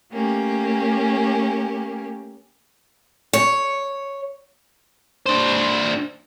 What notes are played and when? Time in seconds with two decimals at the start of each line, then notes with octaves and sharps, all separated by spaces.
0.11 A3 A#3 C#4 G4
3.33 C#5
5.26 D4 C5